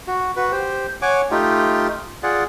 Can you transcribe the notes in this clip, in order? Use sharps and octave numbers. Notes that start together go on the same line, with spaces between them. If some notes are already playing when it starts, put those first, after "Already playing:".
F#4
F#4 B4
G4 C5
C#5 F#5 G#5 C#6 D6
A3 D#4 F4 G4
F4 G#4 D5 F#5